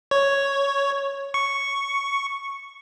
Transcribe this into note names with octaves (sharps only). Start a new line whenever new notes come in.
C#5
C#6